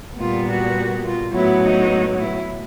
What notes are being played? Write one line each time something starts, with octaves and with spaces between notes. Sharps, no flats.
A#2 G3 B3 F4
F#4
F4
A2 F#3 B3 E4
D#4
E4